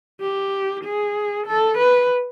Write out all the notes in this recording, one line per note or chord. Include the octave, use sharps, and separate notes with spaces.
G4
G#4
A4
B4